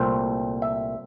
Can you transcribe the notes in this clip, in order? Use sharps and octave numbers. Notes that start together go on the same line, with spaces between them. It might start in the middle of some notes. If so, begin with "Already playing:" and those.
Already playing: C2 A#2 A3 C4 C5
E5